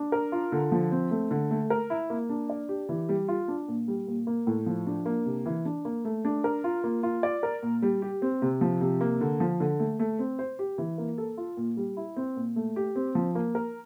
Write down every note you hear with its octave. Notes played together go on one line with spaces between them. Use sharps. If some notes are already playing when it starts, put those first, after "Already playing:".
Already playing: D4
A#4
F4
D3
F3
C4
A3
D3
A3
A#4
E4
A#3
D4
D5
G4
E3
G3
F4
D4
A#2
G3
A#2
A#3
A2
F3
D4
A#3
C3
E3
D4
A#3
A3
D4
A#4
F4
A#3
F4
D5
A#4
A#2
G3
G4
C4
C3
F3
C3
A#3
D3
F3
D3
A3
A3
C4
C5
G4
E3
A#3
A4
F4
A#2
G3
E4
C4
A#2
A3
G4
C4
F3
A#3
A#4